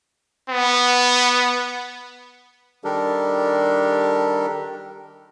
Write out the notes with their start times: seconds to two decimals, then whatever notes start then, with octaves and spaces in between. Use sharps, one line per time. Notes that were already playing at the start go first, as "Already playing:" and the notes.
0.49 B3
2.84 D#3 G3 D4 G4 A4 A#4